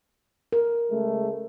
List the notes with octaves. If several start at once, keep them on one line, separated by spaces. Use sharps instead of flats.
A#4
C#3 G#3 A3